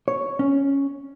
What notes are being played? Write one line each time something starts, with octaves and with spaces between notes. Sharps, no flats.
C#5
C#4